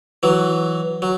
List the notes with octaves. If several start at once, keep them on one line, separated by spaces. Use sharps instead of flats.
E3 F#3
F#3